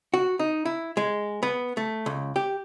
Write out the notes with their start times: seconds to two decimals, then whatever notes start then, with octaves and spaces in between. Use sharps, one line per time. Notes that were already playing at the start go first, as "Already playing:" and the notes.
0.14 F#4
0.39 D#4
0.65 E4
0.97 G#3
1.43 B3
1.77 A3
2.06 C#2
2.36 G4